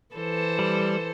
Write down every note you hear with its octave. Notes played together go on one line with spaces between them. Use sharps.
E3 A4 C5
G3